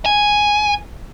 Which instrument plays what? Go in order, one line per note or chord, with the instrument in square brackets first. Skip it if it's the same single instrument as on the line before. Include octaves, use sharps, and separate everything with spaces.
[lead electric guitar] G#5